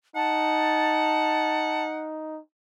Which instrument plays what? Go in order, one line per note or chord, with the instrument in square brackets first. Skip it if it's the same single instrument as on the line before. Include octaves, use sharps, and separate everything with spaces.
[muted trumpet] D#4 [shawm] F#5 [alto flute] A5